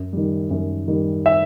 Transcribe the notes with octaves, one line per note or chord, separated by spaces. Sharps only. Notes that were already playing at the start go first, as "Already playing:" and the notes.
Already playing: F#2
D#3 G3
F#2
D#3 G3
E5